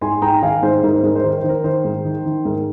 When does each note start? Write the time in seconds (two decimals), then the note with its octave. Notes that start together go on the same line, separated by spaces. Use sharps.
0.01 G#2 G#5 C6
0.22 G#2 G5 A#5
0.42 D#3 F5 G#5
0.62 G#2 C5
0.83 G#2 A#4
0.94 C5
1.03 G#2 A#4
1.16 C5
1.24 D#3 A#4
1.38 C5
1.44 D#3
1.49 A#4
1.64 D#3 C5
1.85 G#2
2.05 D#3
2.26 D#3
2.45 G#2 A#4